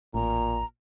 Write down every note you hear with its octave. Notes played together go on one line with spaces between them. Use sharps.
A1 A#2 A#5